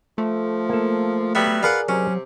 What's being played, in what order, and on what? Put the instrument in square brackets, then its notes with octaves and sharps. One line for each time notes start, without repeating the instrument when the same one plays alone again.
[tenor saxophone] F3 [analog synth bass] A3
[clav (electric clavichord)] A#3 A4
[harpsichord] F#3 G3 B3 [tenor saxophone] E5
[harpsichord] F4 F5 F#5 [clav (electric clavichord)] G#4 A#4 D5 [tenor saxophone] B4
[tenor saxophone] C3 [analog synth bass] F#3 [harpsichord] C#4